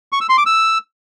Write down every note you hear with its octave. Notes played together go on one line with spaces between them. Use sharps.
C#6
E6
C6
D6
E6